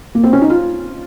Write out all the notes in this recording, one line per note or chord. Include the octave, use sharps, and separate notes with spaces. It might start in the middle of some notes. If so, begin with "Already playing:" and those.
A#3
C4
C#4
D#4
F4